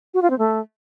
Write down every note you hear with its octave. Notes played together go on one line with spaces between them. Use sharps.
F#4
F4
C4
A3